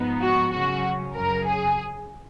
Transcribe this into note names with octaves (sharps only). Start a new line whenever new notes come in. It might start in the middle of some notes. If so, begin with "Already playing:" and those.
Already playing: G#2 F3 B3 D#4
F#4
C#3 F#3 C#4 F#4
F#2 C#3 F#3 A#4
G#4